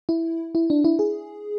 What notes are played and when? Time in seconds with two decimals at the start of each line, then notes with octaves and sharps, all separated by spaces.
0.09 E4
0.55 E4
0.70 D4
0.84 E4
0.99 G#4